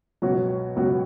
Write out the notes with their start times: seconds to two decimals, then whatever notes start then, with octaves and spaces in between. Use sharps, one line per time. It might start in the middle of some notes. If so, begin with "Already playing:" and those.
0.22 C#2 B2 F#3 C#4 F#4
0.76 C#2 B2 F#3 C#4 F#4